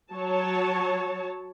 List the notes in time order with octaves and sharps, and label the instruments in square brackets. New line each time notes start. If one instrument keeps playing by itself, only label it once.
[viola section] F#3 C#5 A5